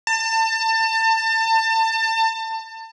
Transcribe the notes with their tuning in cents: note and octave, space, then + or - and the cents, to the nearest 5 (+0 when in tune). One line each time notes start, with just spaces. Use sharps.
A5 +30